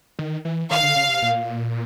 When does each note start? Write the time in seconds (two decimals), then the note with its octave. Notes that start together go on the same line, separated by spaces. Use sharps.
0.19 D#3
0.45 E3
0.71 D#3 F5
0.83 D3
0.96 C#3
1.09 C3
1.22 A#2